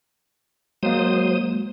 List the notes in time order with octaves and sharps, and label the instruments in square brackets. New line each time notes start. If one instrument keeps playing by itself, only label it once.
[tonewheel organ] F#3 C5 D#6 [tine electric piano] G#3 A#3